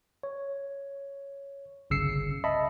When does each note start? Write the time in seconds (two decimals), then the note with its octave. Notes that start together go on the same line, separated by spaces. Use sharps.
0.23 C#5
1.90 G1 C2 C#3 E6 C7 C#7
2.44 D#5 E5 A5 B5